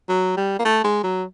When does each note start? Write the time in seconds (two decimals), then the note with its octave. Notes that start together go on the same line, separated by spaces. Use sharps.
0.09 F#3
0.37 G3
0.59 A#3
0.65 A3
0.84 G#3
1.03 F#3